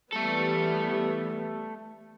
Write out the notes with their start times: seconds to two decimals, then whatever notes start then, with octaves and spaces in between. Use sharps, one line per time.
0.13 E3 G3 A3 B3 A4